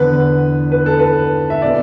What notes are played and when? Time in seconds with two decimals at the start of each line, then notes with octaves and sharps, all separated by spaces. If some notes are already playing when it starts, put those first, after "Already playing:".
Already playing: E2 D3 B3 B4
0.72 B4
0.86 A4
0.99 B4
1.50 E5
1.62 B2 B3 D5